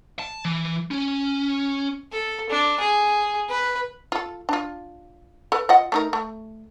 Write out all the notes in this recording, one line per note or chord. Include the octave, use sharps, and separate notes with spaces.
A5
E3
C#4
A4
D4
G#4
B4
F4 A4
D4 F4
A4 B4
F4 D#5 F#5
A3 D#4 A#4
A3